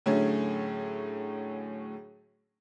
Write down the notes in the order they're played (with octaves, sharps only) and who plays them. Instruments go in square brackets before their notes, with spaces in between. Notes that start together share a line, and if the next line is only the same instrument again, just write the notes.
[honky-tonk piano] A2 D3 F#3 A3 C#4 G#4